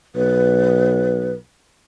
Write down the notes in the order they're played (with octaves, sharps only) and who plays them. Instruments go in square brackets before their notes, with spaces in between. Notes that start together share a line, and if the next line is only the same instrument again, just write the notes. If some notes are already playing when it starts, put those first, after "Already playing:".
[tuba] B1 [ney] B4